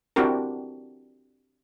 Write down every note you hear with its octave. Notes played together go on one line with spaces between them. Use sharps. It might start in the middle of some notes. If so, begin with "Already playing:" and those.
C4 D4 E4 F#4 G4 A#4